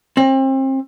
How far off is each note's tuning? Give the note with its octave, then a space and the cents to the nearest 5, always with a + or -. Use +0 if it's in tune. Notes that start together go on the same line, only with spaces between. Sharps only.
C4 +35